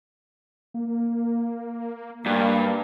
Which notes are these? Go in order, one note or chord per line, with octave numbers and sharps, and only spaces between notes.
A#3
G2 A#3